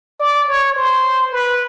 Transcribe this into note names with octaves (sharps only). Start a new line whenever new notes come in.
D5
C#5
C5
B4